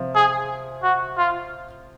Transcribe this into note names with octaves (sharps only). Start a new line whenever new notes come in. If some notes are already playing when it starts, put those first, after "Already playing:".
Already playing: C3 F3
G#4
F#4
F4